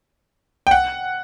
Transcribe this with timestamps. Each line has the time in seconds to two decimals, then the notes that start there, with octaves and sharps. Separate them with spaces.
0.67 G5
0.71 F#5